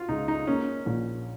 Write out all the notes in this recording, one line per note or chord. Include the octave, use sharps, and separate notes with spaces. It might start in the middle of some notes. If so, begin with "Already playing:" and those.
Already playing: F4 F#4
C#2 D#4
D#4
A#3 C#4
A#1